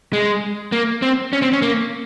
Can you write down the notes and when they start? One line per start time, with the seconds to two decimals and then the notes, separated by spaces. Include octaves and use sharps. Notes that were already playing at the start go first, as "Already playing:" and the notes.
0.13 G#3
0.72 A#3
1.02 C4
1.33 C#4
1.42 C4
1.53 C#4
1.62 A#3